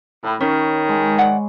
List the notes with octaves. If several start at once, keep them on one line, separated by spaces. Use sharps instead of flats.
A2 B5
D#3 C#4 C#5
G#3
D5 F#5